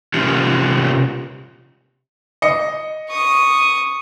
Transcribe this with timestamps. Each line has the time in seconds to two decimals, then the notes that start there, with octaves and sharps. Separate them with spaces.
0.14 C3 C#4 F4 G4
2.42 D#5 C#7
3.09 C#6 D#6